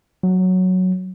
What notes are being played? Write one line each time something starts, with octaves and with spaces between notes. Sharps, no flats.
F#3